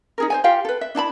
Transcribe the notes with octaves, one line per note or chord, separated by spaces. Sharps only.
D#4 G#4 A#4
C5 C#5 G#5
F4 G4 F5 G5
A4 B4
E5
D4 E4 A5 B5